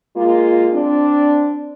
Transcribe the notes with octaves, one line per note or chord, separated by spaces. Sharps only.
G#3 A#3 F4
C4 D4